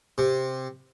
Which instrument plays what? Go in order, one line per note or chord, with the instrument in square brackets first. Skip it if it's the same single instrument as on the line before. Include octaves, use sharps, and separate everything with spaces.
[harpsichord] C3